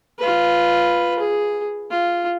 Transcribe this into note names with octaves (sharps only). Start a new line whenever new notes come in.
F4 B4
G#4
F4